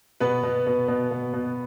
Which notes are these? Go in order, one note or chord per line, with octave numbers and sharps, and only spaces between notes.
B2 B3 B4
B2
B2
B2
B2
B2